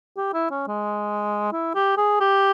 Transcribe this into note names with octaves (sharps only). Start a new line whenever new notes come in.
G4
E4
C#4
G#3
E4
G4
G#4
G4